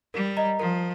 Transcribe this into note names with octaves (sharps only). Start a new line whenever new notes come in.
G3 A#4
D#5 A#5
F3 A#4